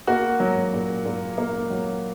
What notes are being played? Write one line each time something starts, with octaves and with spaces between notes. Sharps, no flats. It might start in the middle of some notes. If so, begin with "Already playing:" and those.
A#3 F#4
F#3
A#2
A#2
A#3
F#3